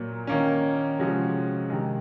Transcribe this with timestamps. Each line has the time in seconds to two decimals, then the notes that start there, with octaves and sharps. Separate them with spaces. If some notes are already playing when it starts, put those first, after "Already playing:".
Already playing: A#2 F#3 A#3
0.27 D#3 A#3 C#4
0.99 C3 F3 G#3 C#4 F#4
1.70 C3 D#3 G#3